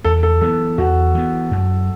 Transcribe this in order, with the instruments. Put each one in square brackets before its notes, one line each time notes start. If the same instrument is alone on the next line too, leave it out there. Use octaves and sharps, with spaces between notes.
[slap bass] E2 [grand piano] A4
[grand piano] A4
[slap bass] E3 B3 [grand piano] A4
[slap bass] E2 [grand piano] F#4
[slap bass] E3 B3
F#2